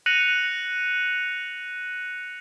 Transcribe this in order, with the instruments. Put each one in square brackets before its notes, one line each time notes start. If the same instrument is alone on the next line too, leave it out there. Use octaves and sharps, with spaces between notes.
[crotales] F#6 A#6 C#7 D#7 F7 F#7